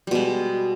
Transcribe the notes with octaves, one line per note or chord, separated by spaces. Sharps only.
B2 G3 G#3